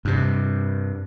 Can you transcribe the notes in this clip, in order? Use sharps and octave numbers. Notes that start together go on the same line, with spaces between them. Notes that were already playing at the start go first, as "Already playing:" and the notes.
G2 C3